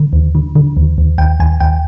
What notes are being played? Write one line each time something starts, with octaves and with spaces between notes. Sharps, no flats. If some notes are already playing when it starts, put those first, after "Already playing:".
Already playing: D3
D#2
D3
D3
D#2
D#2
D#2 G5
D#2 G#5
D#2 G5